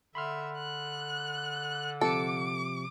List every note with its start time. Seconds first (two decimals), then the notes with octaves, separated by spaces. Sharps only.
0.15 D3 E5 B5 C6 F6
0.57 F#6
2.01 C3 F3 A4 D6 C#7